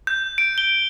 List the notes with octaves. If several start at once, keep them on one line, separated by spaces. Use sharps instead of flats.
G6
D7
G7